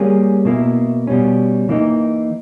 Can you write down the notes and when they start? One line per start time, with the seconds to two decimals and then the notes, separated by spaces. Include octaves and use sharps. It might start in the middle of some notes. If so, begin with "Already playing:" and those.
Already playing: G3 A#3 C#4 G#4
0.45 B2 A#3 E4
1.07 B2 G3 C#4
1.69 E3 A#3 D#4